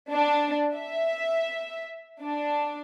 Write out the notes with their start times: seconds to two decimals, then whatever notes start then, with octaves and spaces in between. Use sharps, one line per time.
0.12 D4
0.77 E5
2.23 D4